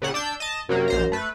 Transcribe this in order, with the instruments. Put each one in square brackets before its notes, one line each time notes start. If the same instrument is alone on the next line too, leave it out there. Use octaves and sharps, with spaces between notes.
[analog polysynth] A#2 C#3 F#5
D4 E6 G6
D#5 A5
[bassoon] F#2 [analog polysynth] C3 F#3 A#3
[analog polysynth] A#1 C5 A#5
A3 B4